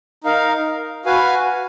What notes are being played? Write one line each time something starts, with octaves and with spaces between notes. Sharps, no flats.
D#4 A#4 F5
F#4 B4 F5 G#5